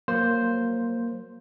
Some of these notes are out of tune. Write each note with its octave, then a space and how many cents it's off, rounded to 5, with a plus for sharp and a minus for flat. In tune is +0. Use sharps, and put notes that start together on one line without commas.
F#3 +0 A#3 +0 C5 +0